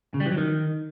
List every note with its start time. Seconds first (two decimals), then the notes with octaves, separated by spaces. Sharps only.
0.14 C#3
0.20 G3
0.26 E3
0.32 F#3
0.38 D#3